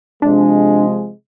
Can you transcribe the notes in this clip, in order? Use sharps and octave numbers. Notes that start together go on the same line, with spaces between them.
C3 F3 G#3 D4